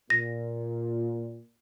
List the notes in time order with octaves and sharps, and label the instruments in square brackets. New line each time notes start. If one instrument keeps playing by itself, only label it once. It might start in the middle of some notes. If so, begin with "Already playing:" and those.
[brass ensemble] A#2 [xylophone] A#6